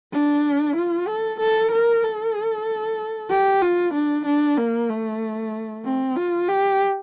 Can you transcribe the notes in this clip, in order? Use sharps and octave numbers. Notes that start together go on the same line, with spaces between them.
D4
F4
A4
A4
A#4
A4
G4
F4
D4
D4
A#3
A3
C4
F4
G4